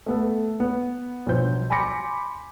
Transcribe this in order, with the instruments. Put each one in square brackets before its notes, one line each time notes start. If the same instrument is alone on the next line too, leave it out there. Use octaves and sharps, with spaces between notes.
[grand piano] A3 B3 A4
B3
B1 G2 F3 C5 G6
G#5 B5 C6 D6 A#6 C#7